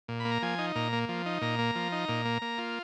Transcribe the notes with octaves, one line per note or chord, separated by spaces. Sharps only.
A#2
B5
A#3
A#5
F3 G#5
D#4
A#2 A#5
A#3
F3
D#4
A#2 A#5
A#3
F3
D#4
A#2
A#3
A#3
F4